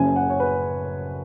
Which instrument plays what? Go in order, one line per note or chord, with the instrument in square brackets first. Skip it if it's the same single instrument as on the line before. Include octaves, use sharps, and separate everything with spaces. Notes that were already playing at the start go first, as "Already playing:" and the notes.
Already playing: [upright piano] F#1 F#2 C#3 G#5
F#5
C#5
B4